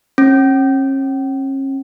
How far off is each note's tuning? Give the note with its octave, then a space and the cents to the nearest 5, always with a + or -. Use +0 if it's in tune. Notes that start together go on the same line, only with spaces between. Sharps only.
C#4 -40